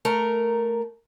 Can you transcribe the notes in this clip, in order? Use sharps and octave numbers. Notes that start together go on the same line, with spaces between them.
A3 A#4 A#5